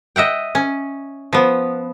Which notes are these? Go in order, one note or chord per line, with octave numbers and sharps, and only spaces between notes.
D#5 E5 F#5 G5
C#4
F3 B3